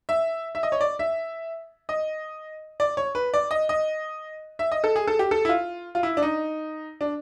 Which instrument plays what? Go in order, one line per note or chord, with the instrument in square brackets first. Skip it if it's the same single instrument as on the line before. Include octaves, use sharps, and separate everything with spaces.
[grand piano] E5
E5
D#5
C#5
D5
E5
D#5
D5
C#5
B4
D5
D#5
D#5
E5
D#5
A4
G#4
A4
G4
A4
E4
F4
F4
E4
D4
D#4
D4